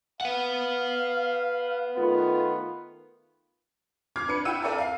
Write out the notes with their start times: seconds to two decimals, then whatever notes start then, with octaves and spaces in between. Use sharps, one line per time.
0.21 B4 F5 F#5
1.96 D#3 A3 B3 F4
4.16 D6 F6 G#6 C7
4.28 D4 B4 C#7
4.45 E4 F#5 G5 E6 D#7
4.62 A4 A#4 D5 E5 F5 A5
4.78 F5 C7